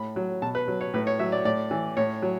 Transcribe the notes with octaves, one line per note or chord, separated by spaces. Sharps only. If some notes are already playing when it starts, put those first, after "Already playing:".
Already playing: A2 B5
F#3
B2 A5
B4
F#3
C#5
A2 B4
C#5
F#3 E5
D5
A2 D5
E3
A2 C#5
F#3